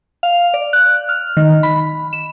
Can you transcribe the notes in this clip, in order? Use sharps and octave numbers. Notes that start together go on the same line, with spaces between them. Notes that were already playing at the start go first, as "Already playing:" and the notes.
F5
D5
F#6
F6
D#3
B5
E7